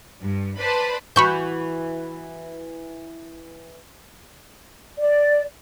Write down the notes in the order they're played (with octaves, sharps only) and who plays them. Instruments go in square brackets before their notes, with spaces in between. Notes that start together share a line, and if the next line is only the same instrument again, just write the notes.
[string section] G2
B4 C5 D5 A5 B5
[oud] E3 F#4 [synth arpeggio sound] B5 C#6 G6
[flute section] D5